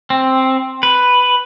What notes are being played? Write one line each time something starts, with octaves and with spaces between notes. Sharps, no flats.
C4
B4